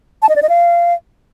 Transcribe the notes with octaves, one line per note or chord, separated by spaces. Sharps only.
A5
D#5
D5
D#5
F5